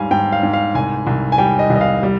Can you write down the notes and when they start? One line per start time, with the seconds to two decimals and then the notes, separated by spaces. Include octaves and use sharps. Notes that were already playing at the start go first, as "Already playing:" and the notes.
Already playing: G#2 G3 F5 G#5
0.11 G#2 G5
0.32 F5
0.43 G#2
0.53 F5
0.75 C2 G#5
1.07 C2
1.32 G#5
1.38 G3 G5
1.59 D#5
1.70 C2
1.76 D#5
1.81 F5
2.03 G3